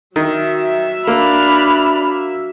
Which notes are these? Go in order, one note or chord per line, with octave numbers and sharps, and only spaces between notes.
D#3 F#3 E5
A#3 D4 B5 F6